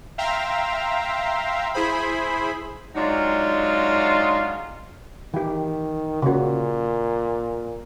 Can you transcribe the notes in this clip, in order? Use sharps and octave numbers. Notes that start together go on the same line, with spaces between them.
E5 F5 G5 A#5 C6
E4 G#4 C5 B5
F#3 G#3 D4 D#4 F4
D#3 E3 G4
A#2 C#3 F#4